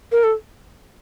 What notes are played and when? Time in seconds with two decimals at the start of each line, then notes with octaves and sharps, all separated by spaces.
0.12 A#4
0.24 A4